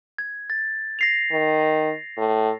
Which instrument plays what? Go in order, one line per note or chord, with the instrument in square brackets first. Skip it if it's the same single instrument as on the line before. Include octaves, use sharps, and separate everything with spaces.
[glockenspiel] G#6
A6
A#6 C7 F7
[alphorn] D#3
A2